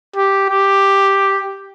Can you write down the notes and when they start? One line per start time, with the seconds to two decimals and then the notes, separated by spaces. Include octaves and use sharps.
0.16 G4
0.50 G4